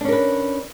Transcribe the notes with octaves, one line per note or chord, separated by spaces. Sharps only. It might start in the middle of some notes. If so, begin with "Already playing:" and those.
C#4 D4 A#4 B4